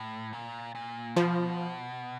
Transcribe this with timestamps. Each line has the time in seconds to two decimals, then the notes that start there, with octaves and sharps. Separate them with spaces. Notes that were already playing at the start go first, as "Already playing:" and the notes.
Already playing: A2
0.33 A#2
0.75 A#2
1.16 B2 F3